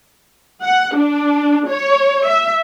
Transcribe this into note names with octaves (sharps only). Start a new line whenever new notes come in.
F#5
D4
C#5
E5